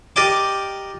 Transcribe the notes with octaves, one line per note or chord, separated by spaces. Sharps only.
G4 A#4 D5 D#5 G5 D6